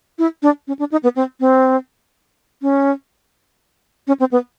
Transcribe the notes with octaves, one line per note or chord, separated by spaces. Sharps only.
E4
D4
C#4
D4
D#4
B3
C4
C4
C#4
C#4
C4
B3